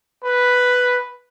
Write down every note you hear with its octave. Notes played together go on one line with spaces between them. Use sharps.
B4